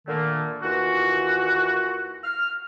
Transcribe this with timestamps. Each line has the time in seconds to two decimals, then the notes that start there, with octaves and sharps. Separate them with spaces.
0.07 A#2 D3 D#3 A3 A#3
0.62 D#2 E3 F4 F#4
2.24 F6